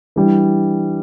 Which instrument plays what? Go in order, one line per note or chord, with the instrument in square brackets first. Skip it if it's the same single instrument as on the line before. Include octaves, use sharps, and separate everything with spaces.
[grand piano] E3 G3 D4